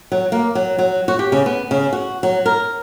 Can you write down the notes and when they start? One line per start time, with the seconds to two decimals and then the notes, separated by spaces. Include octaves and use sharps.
0.12 F#3
0.32 A#3
0.55 F#3
0.79 F#3
1.08 F#4
1.19 G4
1.32 C#3
1.46 B3
1.71 C#3
1.93 F#4
2.23 F#3
2.46 A#4